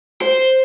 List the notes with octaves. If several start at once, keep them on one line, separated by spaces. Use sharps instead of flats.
C5